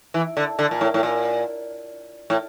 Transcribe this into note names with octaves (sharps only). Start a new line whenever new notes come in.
E3
D3
D3
A#2
A2
A2
A#2
A2